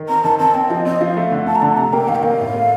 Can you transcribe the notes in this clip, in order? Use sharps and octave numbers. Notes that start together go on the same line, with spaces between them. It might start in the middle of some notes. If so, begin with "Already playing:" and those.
Already playing: D#3
C4 A#5
D#3 A5
C4 A5
C4 G5
F3 D#5
C4 D#5
F3 F5
A3
D3
A3 A5
A#5
D3 A5
C3 A#5
A#3 G5
D#3 F5
G5
A#3 F5
A2
A3